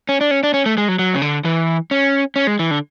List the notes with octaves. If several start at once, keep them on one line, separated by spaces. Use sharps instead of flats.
C#4
D4
C#4
D4
C#4
A3
G#3
F#3
F#3
C#3
D3
E3
C#4
C#4
G#3
E3
D3